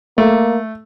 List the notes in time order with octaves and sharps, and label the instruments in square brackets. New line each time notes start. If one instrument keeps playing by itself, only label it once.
[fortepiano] A3 [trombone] A#3